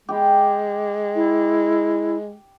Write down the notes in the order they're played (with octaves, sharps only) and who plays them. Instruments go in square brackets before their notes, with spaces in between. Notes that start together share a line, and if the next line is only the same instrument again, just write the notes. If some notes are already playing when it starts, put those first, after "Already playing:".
[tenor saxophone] G#3 [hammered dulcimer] G4 G5
[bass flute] E4